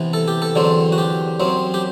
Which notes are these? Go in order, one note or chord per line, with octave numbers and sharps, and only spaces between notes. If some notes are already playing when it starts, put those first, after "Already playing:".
Already playing: C3 E3 B3
A4
G4
A4
E2 D3 F#3 C4
F#4
G4
F#2 F#3 C4
G4